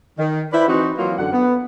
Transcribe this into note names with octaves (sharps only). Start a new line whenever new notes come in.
D#3
E4 B4 C5 D5 E5
E3 C4 D#4 F#4
E3 F#3 A#3 F4
F#2 D3 F#5
B3